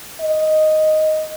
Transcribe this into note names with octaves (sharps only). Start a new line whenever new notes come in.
D#5